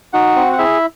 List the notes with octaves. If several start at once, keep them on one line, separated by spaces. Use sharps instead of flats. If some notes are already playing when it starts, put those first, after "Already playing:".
D#4 F#4 F#5
C4
F#5
E4 G#4 E5